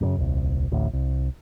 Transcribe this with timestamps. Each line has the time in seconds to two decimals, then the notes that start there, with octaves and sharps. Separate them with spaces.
0.01 F#2 A#2 C#3
0.17 D#1 C2
0.72 A1 D2 A2
0.93 C2